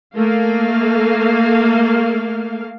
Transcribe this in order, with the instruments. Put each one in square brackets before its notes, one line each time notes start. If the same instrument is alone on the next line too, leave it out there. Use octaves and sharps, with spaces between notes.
[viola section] A3 A#3 F5